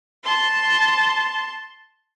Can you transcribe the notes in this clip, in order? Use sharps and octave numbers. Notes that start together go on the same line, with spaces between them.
A5 C6